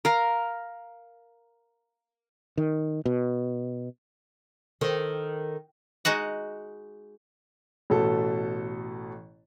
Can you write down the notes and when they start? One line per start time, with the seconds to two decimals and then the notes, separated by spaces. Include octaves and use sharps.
0.05 A#4 F5 A#5
2.58 D#3
3.06 B2
4.81 D#3 A4 A#4 C5
6.05 G#3 D#4 F#4 F#5
7.90 A1 B2 A3 A4